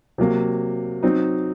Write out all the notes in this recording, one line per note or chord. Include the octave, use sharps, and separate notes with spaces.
C3 F#3 A#3
F#3 C4 D#4